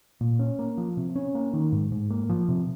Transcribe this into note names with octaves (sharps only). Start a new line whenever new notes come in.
A#2
C#4
A#3
F3
C3
C#4
A#3
D#3
G#2
G#2
A#3
F3
C3